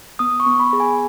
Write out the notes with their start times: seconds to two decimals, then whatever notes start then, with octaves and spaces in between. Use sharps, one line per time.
0.19 B3 D#6
0.40 C#6
0.46 B3
0.60 B5
0.73 G#4
0.80 G#5